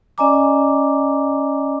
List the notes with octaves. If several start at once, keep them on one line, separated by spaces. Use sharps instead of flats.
C#4 D5 D#5 G#5 A#5 D6